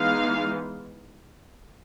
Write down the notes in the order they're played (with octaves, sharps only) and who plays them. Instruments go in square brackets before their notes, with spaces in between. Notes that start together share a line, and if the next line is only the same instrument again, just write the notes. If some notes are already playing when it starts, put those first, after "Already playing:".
Already playing: [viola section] E3 G#3 B3 D#4 F5